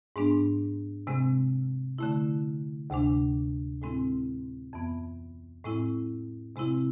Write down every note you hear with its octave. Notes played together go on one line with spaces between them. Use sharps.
G#2 G#3 B3 D4
C3 G#3 C4
D3 A3 E4
D2 C3 G#3 D4
A2 G#3 C4 E4
F2 E3 B3
A2 G#3 C4 E4
C3 G#3 C4 E4